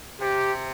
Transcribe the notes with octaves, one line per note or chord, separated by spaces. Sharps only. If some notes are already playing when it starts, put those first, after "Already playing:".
C3 G4